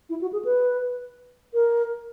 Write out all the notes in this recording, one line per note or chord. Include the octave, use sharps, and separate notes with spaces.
E4
F#4
G#4
B4
A#4